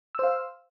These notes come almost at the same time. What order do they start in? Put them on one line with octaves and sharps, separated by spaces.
E6 C5 F5